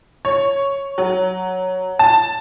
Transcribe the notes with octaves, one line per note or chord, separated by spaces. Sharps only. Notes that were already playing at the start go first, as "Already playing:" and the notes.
C#5
F#3
A5